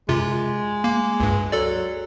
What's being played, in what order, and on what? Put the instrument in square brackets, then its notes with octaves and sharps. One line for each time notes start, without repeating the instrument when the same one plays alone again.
[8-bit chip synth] F#2 C3 F4 [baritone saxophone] G#3
[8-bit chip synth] A#3
C#2 G2
[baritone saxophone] F#3 [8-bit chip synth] A4 D5